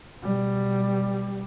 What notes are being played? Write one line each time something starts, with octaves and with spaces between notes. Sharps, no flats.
B2 G3